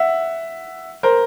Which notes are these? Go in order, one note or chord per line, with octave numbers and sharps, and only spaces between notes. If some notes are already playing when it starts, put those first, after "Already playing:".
Already playing: E5 F#5
A#4 C5